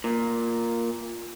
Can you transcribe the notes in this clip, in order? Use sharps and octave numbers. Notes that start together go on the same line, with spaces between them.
A#2